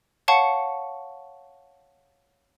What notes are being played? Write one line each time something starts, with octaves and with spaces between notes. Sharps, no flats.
C#5 F5 F#5 A5 C#6 C#7